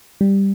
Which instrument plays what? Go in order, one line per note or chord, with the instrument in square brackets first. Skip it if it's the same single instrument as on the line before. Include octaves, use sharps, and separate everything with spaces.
[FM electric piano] G3